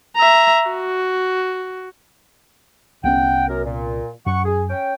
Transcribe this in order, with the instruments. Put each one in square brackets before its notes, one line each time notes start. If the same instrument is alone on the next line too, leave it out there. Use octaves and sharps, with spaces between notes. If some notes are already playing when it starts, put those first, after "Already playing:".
[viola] E5 A#5
F#4
[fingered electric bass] C2 B3 C#4 [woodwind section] F#5 G5
[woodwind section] F#2 A#4
A#2
[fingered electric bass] F#2 [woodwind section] F#5 C#6
[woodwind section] G#4
C#4 G5